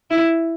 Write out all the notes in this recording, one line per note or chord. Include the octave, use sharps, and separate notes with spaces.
E4